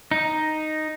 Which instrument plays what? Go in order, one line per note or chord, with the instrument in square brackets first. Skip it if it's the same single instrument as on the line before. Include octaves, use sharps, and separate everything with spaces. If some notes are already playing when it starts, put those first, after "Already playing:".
[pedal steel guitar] D#4